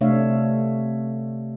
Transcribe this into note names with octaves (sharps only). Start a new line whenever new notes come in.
C3 A3 D4 C#5 E5 F5